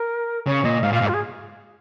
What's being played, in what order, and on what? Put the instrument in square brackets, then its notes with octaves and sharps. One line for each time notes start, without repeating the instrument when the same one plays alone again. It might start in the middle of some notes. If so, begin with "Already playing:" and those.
Already playing: [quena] A#4
[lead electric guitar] C#3 [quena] C#5
[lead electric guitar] A#2 [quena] D#5
[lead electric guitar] G#2 [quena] F5
[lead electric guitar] A#2
[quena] F5
[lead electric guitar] G#2
[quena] F4
G#4